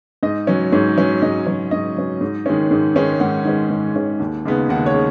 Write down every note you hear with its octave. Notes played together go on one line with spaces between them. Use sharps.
G#2 D#5
F#3 C#4
G#2 C#5
F#3 C#4
G#2 D#5
F#3 C#4
G#2 D#5
F#3 C#4
G#2
D#3 G#3 C#4
G#2
D#3 G#3 C#4
G#2 F#5
D#3 G#3 C#4
G#2
D#3 G#3 C#4
D#2
C#3 G#3 B3 D#4
D#2 F#5
C#5
C#3